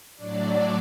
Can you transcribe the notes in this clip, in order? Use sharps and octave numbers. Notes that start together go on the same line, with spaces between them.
A2 F#3 D4 D5
D4 D5